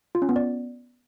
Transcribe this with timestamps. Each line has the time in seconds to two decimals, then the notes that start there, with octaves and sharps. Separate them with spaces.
0.15 F4
0.22 C#4
0.29 B3
0.36 D5